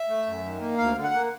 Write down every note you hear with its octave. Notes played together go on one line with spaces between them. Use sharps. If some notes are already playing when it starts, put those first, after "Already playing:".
Already playing: E5
A3
F#2
D#3
A#3
D2 F5
D3
F#5
A#3